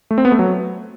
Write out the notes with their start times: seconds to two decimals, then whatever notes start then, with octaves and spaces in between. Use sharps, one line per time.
0.11 A3
0.18 C4
0.25 B3
0.32 A3
0.39 F#3